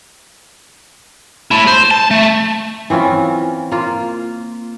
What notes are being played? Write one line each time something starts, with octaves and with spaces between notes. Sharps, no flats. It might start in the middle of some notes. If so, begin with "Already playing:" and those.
A3 E4
C5
A5
A3
E3 C4 C#4 F4
A#3 F4